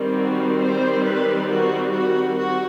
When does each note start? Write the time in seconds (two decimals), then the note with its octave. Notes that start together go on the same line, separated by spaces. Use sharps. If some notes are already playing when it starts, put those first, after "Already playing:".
Already playing: D#3 G3 C4
0.15 F#4
0.60 C5
1.03 B4
1.47 F#4
1.91 F#4
2.36 F#4